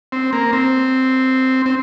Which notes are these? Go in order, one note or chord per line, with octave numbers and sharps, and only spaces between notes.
C4
A#3
C4
C4